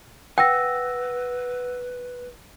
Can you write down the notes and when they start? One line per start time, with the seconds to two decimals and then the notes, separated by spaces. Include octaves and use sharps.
0.38 B4 F#5 G5 E6 A#6